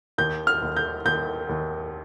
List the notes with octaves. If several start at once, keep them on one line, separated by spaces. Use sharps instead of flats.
D#2 G6
F6
D#2
G6
D#2 G6
D#2